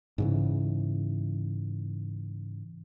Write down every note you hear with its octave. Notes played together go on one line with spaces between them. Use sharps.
G#2 C#3 E3